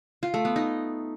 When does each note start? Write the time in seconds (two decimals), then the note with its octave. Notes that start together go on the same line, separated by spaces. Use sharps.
0.23 F4
0.34 A3
0.45 B3
0.56 D#4